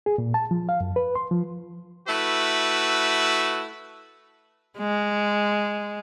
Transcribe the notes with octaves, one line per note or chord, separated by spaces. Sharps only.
G#4
A#2
A5
F3
F5
F#2
B4
C6
F3
A3 E4 F#4 B4
G#3